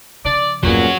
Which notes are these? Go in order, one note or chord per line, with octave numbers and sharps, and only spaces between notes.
C#3 F3 D5
E2 G2 A#2 F#3 G#3 B3 C#4 F#4